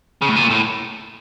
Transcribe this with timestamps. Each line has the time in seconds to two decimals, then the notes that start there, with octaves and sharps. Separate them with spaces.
0.22 C#3
0.29 A2
0.36 A#2
0.51 A2